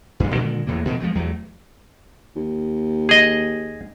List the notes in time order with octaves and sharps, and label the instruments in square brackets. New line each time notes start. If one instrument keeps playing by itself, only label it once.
[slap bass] A1 G2
A#2 D3 D#3 G#3
E2 A2 C3 A#3
F2 B2 D3 D#3
F3 F#3 G#3 A3
E2 F#3 G3 A3
[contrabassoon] D#2
[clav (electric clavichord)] G#4 D#5